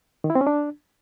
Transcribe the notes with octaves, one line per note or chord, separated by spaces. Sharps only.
D#3
E4
C4
C#4
D4